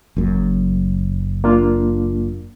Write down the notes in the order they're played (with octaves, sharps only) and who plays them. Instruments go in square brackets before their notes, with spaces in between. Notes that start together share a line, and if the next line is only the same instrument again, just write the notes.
[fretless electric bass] F#1 F#2
[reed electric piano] A#3 D4 F4